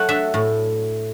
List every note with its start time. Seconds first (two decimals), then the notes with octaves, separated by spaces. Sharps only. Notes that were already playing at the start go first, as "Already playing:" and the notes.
Already playing: F#3 A3 F#5
0.08 D4 E5
0.34 A2